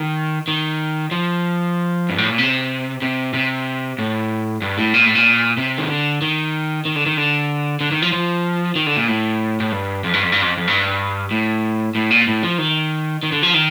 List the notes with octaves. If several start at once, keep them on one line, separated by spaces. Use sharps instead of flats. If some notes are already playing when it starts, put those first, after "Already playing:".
Already playing: D#3
D#3
F3
G2
A2
A#2
C3
C3
C3
A2
G2
A2
A#2
A2
A#2
C3
D#3
D3
D#3
D#3
D3
D#3
D3
D3
D#3
F3
F3
D#3
D3
A#2
A2
A2
G2
F2
G2
F2
G2
F2
F2
G2
A2
A2
A#2
A2
F3
D#3
D#3
D3
F3
D#3